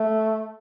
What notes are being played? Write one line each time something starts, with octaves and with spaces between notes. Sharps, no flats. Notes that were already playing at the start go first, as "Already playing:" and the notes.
Already playing: A3